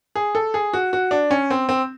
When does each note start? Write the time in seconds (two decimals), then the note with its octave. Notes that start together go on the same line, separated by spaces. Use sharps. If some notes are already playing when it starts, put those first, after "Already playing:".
0.15 G#4
0.35 A4
0.54 G#4
0.73 F#4
0.93 F#4
1.11 D4
1.31 C#4
1.51 C4
1.69 C4